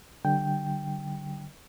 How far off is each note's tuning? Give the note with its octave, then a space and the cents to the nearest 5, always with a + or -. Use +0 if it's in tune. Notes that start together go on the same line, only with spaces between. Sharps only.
D3 +0 G3 -45 G5 +0